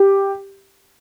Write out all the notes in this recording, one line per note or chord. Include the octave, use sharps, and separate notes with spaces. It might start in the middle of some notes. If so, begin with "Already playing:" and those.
Already playing: G4